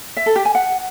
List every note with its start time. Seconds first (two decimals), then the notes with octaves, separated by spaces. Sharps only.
0.17 E5
0.26 A4
0.36 G4
0.45 G#5
0.55 F#5